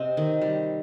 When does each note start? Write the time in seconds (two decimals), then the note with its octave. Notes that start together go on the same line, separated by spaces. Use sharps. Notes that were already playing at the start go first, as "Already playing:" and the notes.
Already playing: C3 C4 D#5
0.17 D#3
0.42 G3